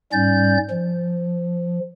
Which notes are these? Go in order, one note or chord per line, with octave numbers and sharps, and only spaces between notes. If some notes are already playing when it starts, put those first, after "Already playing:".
G#2 G3 C#4 D5 G6
F3